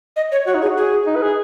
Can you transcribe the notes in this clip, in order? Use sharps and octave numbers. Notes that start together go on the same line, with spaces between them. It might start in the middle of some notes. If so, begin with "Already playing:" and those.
D#5
C#5
F#4 C#5
D#4
F#4 G#4
G#4
D#4
B4
G#4